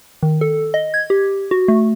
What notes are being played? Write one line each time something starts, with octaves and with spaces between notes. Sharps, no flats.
D#3
A4
D#5
G#6
G4
F#4
A3